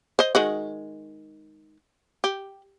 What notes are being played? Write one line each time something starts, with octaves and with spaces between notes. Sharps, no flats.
C5 D#5
D#3 G#3 F#4
G4